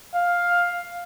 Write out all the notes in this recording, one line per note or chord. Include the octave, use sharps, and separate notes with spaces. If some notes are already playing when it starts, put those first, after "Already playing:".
F5